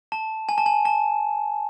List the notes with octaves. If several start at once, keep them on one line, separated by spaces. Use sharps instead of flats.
A5
G#5
A5
G#5
A5